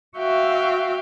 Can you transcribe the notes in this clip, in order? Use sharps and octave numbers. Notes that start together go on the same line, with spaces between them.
F#4 E5 F5 G5